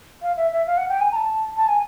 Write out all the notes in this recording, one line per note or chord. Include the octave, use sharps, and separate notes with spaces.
F5
E5
E5
F5
F#5
G5
G#5
A#5
A5
A5
G#5